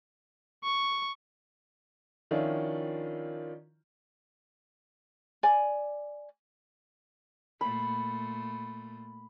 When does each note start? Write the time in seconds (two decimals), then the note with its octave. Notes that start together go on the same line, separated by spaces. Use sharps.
0.64 C#6
2.31 D#3 F3 C#4 D4 E4 F4
5.43 D5 G#5
7.61 A#2 A3 B5